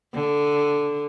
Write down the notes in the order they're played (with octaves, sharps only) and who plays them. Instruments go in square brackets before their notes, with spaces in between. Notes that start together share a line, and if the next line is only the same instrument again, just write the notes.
[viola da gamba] D3